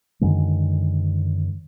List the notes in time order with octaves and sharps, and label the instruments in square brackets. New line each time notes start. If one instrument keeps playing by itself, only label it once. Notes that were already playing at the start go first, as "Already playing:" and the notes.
[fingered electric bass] F#2 D3 D#3 G#3